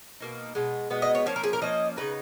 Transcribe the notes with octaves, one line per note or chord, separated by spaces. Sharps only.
B2 A#3 D#4
B2 G#3 B3
B2 G#3 B3
D#5
C#5
F3 A#3 C#4 C#5
A#4
G#4
A#4
F3 A#3 C#4 D#5
C#3 F3 B3 D#4 B4